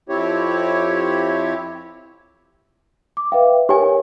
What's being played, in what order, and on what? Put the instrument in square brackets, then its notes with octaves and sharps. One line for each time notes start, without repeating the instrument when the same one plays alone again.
[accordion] F2 F3 C4 E4 G4 C#5
[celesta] D6
[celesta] B4 E5 F5 [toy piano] G5
[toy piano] G4 G#5 [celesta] A#4 C#5